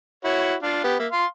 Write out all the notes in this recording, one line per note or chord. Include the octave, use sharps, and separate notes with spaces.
E4 F#4 C#5
D4 F4 F5
B3 G4
A#3 E5
F5 C6